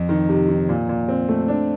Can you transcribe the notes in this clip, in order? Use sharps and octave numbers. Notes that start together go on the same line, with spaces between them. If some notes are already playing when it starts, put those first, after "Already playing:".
Already playing: F2
D#3
C3
D#3
A#2
A#2
C4
A3
D4